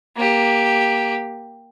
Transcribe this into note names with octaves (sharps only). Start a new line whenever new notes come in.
A#3 G4